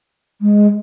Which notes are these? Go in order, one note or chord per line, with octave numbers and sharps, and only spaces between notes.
G#3